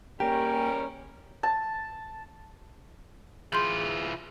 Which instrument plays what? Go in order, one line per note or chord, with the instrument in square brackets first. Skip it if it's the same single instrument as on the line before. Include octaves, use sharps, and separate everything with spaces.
[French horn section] E2 G3 C#4 [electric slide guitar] A#3 G4 [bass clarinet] A#4 [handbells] G5
[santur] A5
[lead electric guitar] E3 F4 [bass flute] G#4 [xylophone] C6 G6 F#7